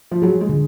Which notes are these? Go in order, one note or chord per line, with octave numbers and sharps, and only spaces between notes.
F3
F#3 G#4
G#3
D3